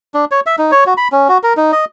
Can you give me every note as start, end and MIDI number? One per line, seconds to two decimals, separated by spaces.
0.14 0.25 62
0.31 0.40 73
0.46 0.56 76
0.58 0.71 63
0.71 0.84 73
0.86 0.94 66
0.97 1.08 83
1.12 1.28 61
1.29 1.38 66
1.43 1.53 70
1.57 1.72 63
1.72 1.85 75